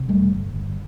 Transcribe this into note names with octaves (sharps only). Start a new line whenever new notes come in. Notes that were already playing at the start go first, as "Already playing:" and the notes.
Already playing: C3
E1 G3 A3
G1
G1